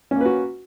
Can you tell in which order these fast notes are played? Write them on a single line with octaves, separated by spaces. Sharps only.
C#4 A#3 B4 F#4